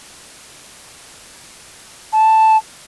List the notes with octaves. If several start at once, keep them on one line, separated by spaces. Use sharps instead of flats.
A5